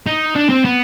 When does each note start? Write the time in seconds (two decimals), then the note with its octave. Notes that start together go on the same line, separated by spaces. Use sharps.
0.07 D#4
0.35 D4
0.49 C4
0.65 B3